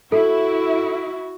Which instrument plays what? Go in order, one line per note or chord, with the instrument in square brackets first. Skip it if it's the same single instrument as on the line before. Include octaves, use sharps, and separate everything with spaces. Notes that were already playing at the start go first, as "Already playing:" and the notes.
[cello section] E4 [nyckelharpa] F#4 [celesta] A4